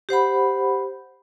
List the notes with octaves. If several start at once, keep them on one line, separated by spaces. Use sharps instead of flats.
G4 C5 F#5 B5